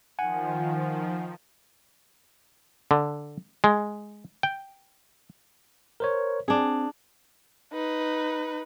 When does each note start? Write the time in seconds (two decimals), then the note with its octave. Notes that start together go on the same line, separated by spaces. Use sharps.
0.19 D#3 F3 F#5 G#5
2.91 D3
3.64 G#3
4.43 G5
6.00 A#4 C5 C#5
6.48 C4 D4 G#4
7.73 D#4 B4